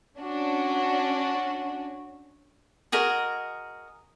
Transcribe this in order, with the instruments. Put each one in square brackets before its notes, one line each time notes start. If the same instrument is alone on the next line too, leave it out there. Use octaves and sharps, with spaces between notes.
[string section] C#4 D4 F#4
[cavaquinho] F#4 G#4 A#4 D#5